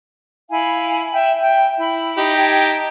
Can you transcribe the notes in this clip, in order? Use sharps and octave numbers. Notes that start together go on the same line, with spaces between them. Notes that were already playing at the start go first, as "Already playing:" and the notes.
E4 F5 G#5
E5 G5
E5 G5
E4
D#4 G4
G5 A5 G#6